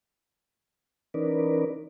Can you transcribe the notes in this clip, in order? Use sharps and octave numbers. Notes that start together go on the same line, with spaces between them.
E3 C#4 D#4 A#4 B4 D5